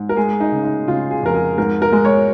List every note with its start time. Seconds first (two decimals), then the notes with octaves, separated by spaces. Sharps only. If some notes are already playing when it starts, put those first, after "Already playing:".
Already playing: G#2
0.09 A#4
0.16 G#3 G#4
0.40 D#4
0.52 C#3
0.64 D#4
0.88 C#3 F4
1.10 G#4
1.23 F2 A#4
1.34 G#4
1.57 G#2 A#4
1.82 A#4
1.92 G#3
2.05 C#5